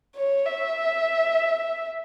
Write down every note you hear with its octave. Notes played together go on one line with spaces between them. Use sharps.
C#5
E5